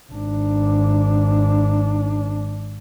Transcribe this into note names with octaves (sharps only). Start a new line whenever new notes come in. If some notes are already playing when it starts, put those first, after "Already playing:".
G#1 D4